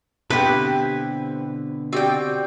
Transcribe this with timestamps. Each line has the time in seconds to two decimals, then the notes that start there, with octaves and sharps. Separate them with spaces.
0.30 B2 D3 C4 E4 G4 B4
1.93 C4 F#4 G4 D5 G5